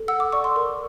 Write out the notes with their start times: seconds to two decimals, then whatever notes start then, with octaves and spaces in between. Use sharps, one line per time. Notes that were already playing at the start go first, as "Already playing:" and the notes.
Already playing: A4
0.08 F#5 E6
0.20 D6
0.32 D5 C#6
0.44 C6
0.56 A#4